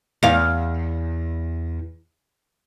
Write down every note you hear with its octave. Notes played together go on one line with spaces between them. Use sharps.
E2 F5